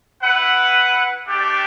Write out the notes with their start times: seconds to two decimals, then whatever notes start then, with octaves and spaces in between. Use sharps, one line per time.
0.22 E4 B4 F#5
1.26 A3 D4 G4 D5 G5